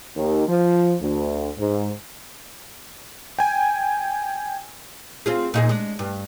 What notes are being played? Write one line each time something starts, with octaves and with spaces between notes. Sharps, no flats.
D#2
F3
D2
G#2
G5 G#5
C4 F4 G#4
A#2 D#4 G#4
G#3 D4
G2